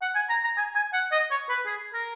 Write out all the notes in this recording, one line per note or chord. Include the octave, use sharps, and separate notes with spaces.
F#5
G#5
A#5
A#5
G#5
G#5
F#5
D#5
C#5
B4
G#4
A#4